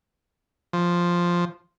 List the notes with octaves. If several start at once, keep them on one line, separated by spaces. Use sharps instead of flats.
F3